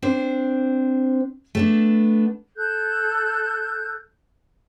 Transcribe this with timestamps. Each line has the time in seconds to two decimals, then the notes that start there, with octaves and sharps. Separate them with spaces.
0.02 C4 D4 C5
1.55 A3 B3 D4
2.57 A4 F#6 G6